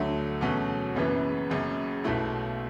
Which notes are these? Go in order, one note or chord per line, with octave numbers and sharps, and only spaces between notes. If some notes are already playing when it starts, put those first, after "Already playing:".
Already playing: D2 D3 F#3 A3
E2 B2 F#3 A3 C#4
F#1 F#2 C#3 E3 B3
F#1 F#2 C#3
B1 B2 A3 E4